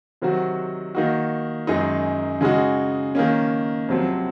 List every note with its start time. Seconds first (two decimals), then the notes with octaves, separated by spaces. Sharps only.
0.22 C3 D#3 F#3 C4 F#4
0.95 D#3 A#3 D#4 F#4
1.67 F#2 D#3 G#3 D#4
2.41 C#3 G#3 D#4 F#4
3.15 D#3 A#3 C#4
3.88 F2 C3 F#3 C4